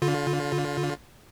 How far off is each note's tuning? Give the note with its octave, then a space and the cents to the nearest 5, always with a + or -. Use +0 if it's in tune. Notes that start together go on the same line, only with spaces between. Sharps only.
D3 -35 F4 +20